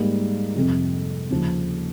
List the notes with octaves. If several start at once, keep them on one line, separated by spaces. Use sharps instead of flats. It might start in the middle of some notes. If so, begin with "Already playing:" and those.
Already playing: G#2 G3 A#3
F2 C3 F3
D#2 C#3 F3 A#3 C#4